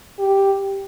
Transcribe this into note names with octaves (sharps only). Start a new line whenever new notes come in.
G4